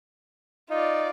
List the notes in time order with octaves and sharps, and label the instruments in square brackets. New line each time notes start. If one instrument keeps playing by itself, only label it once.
[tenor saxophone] D#4 [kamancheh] F4 D5